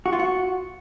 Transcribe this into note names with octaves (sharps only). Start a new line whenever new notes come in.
F#4
F4
F#4